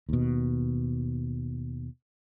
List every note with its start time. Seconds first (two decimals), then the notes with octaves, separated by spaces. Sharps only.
0.09 D#2 B2